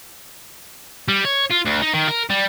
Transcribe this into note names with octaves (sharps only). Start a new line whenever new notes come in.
G3
C#5
F4
D2
D#4
D#3
A#4
G3